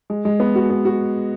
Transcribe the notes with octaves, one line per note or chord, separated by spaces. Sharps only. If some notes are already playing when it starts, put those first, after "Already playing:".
G#3
G#3
B3
F#4
B3
F#4